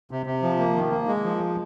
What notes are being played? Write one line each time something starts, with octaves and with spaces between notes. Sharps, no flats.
C3
C3
F3
A#3
D#3
A#3
G#3
F3